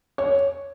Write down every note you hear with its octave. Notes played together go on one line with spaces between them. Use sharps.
C#5